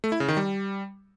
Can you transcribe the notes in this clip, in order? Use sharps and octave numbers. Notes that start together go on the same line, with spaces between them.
A3
E4
C#3
D#3
G3